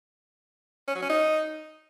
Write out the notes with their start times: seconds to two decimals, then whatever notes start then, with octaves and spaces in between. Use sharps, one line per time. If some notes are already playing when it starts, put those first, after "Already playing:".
0.88 C#4
0.95 F#3
1.02 C#4
1.09 D#4